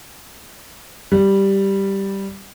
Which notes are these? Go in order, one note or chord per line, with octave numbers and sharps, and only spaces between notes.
G3